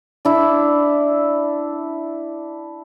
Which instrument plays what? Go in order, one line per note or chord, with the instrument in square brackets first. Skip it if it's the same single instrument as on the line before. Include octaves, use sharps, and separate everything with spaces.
[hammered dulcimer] D4 E4